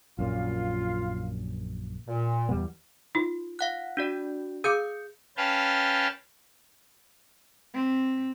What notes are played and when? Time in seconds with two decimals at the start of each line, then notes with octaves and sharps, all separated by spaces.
0.19 A#1 F#2 A#2 F4 F5
2.07 A#2
2.49 E2 G3 B3
3.15 D#4 F4
3.59 F5 F#5 F#6
3.97 D4 F#4 D5
4.64 G#4 F5 D6 D#6 G6 C#7
5.37 C#4 B4 F5 G5 A5
7.74 C4